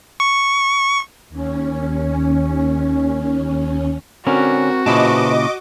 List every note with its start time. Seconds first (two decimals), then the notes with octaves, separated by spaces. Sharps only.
0.20 C#6
1.30 D#2 C#4
4.27 D3 C4 C#4 F#4 A#4
4.86 A#2 C#3 E4 B4 C5 D#5 A5 D6